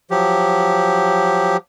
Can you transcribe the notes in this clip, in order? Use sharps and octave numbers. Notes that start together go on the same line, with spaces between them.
F3 F#3 G4